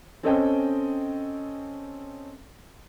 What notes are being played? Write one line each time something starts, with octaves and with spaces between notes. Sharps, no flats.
C4 C#4 A4 C5 D#5 G5